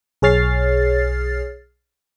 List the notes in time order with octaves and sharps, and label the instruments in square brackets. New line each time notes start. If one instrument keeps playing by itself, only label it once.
[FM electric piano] B1 G#4 C#5 F6 A6 C7